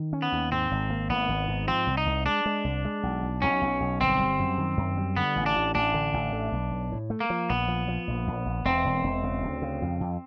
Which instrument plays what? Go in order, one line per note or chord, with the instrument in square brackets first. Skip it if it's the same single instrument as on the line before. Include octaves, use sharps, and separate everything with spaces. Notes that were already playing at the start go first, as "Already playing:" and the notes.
Already playing: [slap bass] D#3
C#4
[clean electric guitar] B3
[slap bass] D#2
[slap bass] G#2 [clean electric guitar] C4
[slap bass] G#1
A#3
[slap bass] G#1 [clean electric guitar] B3
[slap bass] G#1
G#2
[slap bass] F3 [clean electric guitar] C4
[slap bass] C2
[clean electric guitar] D#4
[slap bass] C2
[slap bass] G#3 [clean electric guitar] D4
[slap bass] G#3
C2
G#3
B1
B1
[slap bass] B1 [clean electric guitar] C#4
[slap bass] B1
B1
[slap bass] G1 [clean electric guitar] C4
[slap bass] G3
F#2
D#3
F#2
G3
[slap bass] D3 [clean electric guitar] B3
[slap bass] A1
[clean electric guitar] D4
[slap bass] A1
[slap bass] A1 [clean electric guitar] D4
[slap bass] D3
A1
A3
B1
B1
A2
A3
[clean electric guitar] A#3
[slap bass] F3
[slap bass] A#1 [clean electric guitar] B3
[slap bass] F3
F3
A#1
A#1
A#1
[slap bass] E1 [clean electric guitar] C4
[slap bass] E1
E1
C#3
D2
C#3
F2
F2